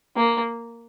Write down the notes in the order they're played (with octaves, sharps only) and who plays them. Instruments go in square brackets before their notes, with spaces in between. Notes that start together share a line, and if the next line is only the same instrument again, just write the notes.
[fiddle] A#3